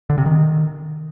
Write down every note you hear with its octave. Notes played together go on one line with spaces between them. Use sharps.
D3
C3
D#3